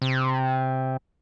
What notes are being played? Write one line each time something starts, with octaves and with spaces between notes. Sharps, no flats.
C3